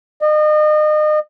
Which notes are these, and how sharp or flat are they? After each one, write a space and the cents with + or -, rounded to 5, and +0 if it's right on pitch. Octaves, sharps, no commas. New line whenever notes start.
D#5 -35